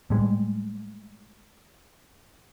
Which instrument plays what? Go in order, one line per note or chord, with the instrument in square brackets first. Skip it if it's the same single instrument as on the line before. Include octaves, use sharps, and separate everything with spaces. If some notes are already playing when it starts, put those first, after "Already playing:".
[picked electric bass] A2 G3 G#3